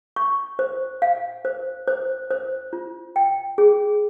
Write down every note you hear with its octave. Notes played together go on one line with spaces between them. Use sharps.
C#6
C5
F5
C5
C5
C5
F4
G5
G#4